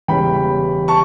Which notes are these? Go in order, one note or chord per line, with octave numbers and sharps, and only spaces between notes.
E1 E2 C#3 G3 C#4 G5 B5
A5 C#6